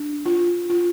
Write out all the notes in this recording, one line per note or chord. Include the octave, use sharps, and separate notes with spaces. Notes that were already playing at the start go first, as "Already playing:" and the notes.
Already playing: D4
F4
F4